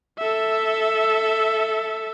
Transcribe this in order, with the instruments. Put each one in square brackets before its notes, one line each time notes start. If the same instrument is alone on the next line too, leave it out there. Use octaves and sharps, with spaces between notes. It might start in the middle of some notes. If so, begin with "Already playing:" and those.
[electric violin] A4 E5